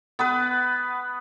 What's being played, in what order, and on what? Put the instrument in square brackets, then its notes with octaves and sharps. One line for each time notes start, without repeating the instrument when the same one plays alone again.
[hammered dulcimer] B3 B4